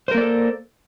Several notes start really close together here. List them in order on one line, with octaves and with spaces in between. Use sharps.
C5 A#4 A#3 D5 A4